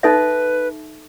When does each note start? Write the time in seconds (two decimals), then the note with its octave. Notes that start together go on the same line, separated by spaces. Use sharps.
0.03 D#4 A4 B4 E5